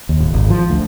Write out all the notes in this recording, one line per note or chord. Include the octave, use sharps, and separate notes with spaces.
D#2
D1
G#1
F3
D2